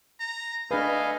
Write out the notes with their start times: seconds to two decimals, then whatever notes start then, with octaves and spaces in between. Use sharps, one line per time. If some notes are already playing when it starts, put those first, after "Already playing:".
0.21 A#5
0.71 A3 D4 G#4 B4 D#5 F5 G#5